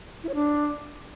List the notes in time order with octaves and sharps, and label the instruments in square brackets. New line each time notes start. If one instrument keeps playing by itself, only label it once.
[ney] E4
C#5
D4